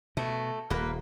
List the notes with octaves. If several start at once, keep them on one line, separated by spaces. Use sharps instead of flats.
B2 A3
D#1 A#3 B4